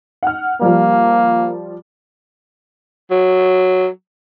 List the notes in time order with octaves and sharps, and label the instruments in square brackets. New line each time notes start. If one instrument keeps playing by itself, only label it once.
[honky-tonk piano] F#5 F6
[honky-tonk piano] F3 G3 [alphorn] A#3
[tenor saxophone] F#3